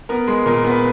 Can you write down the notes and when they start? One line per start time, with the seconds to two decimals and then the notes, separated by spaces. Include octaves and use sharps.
0.09 B3 A#4
0.28 G#3
0.46 A#2 A#4
0.64 B3
0.70 B4